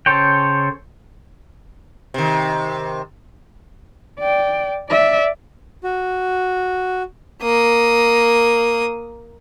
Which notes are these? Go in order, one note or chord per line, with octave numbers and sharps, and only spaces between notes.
C#3 A4 C5 C#5 G5
C3 D#3
D5 G5
D5 E5
F#4
A#3 D#6